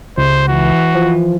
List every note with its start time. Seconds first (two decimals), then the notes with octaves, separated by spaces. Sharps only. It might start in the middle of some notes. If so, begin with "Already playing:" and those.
0.18 C#2 C5
0.48 E3 F#4
0.95 F3